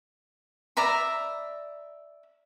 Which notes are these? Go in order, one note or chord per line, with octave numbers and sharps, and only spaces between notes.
D5 E5 A#5 B5